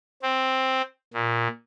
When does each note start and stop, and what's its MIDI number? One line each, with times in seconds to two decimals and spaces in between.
0.23 0.82 60
1.13 1.47 46